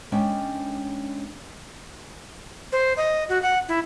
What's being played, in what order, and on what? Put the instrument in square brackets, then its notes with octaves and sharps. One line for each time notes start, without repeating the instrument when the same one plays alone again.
[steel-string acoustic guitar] G#3 C#4 D4 G5
[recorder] C5
D#5
F#4
F#5
E4